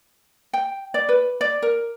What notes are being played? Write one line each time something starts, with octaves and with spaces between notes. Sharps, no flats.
G5
D5
B4
D5
A#4